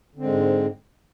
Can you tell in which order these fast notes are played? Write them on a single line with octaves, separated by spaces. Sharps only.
D3 C4 G#3 G#2